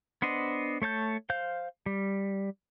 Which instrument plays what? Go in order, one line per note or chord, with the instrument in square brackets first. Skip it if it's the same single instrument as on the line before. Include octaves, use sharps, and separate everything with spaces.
[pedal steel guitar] B3 D4 C5 D#5
A3 C#5 A5 G6
C5 F5 G6
G3